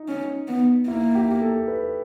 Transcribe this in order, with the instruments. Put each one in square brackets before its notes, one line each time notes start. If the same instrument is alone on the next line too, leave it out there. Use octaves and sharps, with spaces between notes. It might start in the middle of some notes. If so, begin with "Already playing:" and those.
Already playing: [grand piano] D#4
[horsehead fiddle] C#4
B3
[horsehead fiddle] A#3 [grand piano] E4
[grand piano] G4
A4
B4